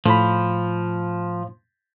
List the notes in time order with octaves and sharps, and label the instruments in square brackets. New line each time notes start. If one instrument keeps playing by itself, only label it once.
[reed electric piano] A2 B5 [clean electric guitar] F3